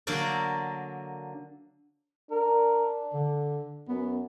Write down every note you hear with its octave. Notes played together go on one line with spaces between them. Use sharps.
D3 F#3 A#3 D4 A#4 D5
D4 A#4
D3
F#2 B3